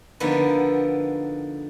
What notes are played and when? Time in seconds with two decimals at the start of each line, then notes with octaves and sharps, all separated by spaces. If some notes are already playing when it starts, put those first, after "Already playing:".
0.20 D3 F3 A#3 B3 D#4